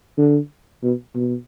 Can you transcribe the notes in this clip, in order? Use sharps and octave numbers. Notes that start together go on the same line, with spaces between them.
D3
B2
B2